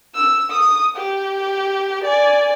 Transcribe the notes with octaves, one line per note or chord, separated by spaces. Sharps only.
E6
D#6
G4
D5 G#5